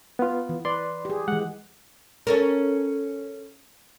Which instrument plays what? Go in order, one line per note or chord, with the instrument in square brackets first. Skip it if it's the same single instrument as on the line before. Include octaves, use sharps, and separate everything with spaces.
[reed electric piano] B3 F4
[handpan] E3
[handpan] B4 [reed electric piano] D5 C6
[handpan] G4 G#4
[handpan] E3 G#3 [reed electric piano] F#5
[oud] C#4 A4 A#4